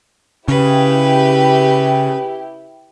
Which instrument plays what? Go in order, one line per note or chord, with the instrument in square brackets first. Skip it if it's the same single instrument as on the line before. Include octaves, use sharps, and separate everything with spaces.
[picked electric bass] C#3 [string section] E4 G4 [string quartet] B4